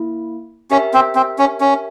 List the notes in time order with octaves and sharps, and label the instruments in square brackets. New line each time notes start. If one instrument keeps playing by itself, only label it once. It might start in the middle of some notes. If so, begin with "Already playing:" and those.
Already playing: [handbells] A#3 E4
[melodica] C#4 [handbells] G4 A#4 E5
[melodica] C4
C4
C#4
C#4